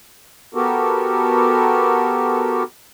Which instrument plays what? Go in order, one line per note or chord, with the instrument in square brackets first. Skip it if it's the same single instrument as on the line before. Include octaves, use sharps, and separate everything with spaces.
[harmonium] B3 F#4 G4 A4 A#4